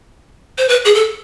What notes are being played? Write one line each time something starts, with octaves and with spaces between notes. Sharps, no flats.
C5
B4
G#4
A4